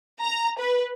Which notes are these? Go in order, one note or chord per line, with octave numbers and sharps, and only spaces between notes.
A#5
B4